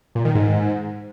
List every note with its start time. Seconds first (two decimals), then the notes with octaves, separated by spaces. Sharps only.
0.15 A#2
0.25 D#3
0.35 G#2